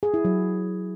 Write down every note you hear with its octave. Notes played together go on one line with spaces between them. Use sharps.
G#4
E4
F#3